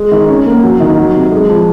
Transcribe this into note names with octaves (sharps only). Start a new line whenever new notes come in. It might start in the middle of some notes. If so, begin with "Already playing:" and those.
Already playing: G#3
D#3
C#4
A#3
F#3
D#3
F#3
C3
G#3
F3